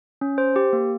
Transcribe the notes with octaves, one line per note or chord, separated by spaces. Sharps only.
C#4
C5
G4
A#3